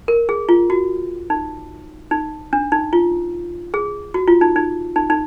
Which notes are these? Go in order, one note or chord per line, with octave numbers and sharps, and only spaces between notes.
A#4
G#4
F4
F#4
D#4
D#4
D4
D#4
F4
G#4
F#4
F4
D#4
D#4
D#4
D#4